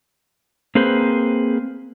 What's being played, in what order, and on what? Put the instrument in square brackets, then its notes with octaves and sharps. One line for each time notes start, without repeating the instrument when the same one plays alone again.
[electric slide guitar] A#3 C4 G#4 B4 C5